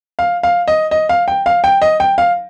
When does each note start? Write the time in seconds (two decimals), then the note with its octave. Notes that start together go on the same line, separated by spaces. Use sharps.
0.19 F5
0.43 F5
0.68 D#5
0.91 D#5
1.09 F5
1.28 G5
1.46 F5
1.64 G5
1.82 D#5
2.00 G5
2.18 F5